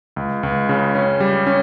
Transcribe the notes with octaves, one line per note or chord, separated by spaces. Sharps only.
C#2
C#2
C#3
C#4
G3
C#4